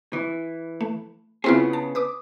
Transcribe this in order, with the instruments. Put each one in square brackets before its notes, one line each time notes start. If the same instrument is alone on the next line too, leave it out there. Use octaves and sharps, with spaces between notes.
[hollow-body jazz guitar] E3
[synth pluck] A3
[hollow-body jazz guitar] C#3 B3 G#4 [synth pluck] C4 E4 F4
[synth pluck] A5
B4 D6 D#6